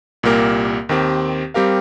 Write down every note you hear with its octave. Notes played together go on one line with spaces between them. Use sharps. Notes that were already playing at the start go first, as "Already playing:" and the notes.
C2 A#2 A#3 G4 A#4
D#2 D#3 C4 G4
G3 C4 G4 A#4 F5